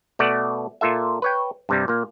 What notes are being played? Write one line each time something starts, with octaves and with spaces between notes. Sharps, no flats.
B2 A3 D5 F#5
A#2 F4 A4 E5
B4 C#5 G5
G2 C3 G3
A#2 A#3